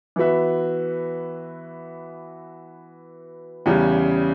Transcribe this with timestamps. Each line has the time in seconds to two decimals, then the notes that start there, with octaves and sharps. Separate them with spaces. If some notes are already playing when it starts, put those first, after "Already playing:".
0.16 E3 B3 F#4 B4 E5
3.66 E2 C#3 G3 C#4